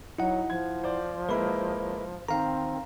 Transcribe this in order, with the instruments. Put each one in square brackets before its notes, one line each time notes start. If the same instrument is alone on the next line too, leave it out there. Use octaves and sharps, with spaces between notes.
[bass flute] F#3 [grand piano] D#4 [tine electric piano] E4 F#5
[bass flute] F3 [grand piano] G#6
[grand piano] C5 D5
[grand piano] G#3 A#3 E4 [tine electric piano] B4 B5
[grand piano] D#3 [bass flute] C4 [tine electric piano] F5 A#5